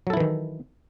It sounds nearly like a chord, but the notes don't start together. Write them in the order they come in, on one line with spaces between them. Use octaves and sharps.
F#3 A4 E4 E3 D#3